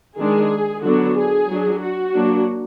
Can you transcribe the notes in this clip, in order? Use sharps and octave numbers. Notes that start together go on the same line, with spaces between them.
D#3 G#3 D4 G#4
D3 F#3 B3 D4 F#4
G#4
F#3 D4
F#4
F#3 A#3 D4